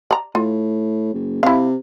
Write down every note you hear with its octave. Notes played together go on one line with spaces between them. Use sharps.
D5 A#5
A2 F4
F#1
C3 E4 F5